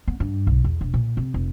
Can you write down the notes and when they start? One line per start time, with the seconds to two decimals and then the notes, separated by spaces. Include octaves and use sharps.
0.08 B3
0.20 G2
0.47 B1
0.64 E2
0.81 E1
0.94 A#2
1.17 C3
1.34 F1